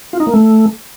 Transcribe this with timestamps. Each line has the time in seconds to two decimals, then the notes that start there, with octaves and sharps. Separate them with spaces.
0.13 F4
0.20 D#4
0.27 A#3
0.34 A3